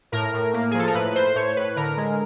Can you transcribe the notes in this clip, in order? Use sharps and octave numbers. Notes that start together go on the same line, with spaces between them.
A2 A#4
A2
A#3
G#4
F3 A4
A#4
A2 B4
A2 C5
A2 C#5
A2 B4
D3 A#4
G#3